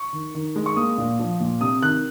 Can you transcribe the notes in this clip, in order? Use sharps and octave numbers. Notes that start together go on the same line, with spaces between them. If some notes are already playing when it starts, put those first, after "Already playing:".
Already playing: C#6
D#3
D#3
G#3
C#6
A#3 D#6
A#2
F3
A#2
C3 D#6
D#3 F#6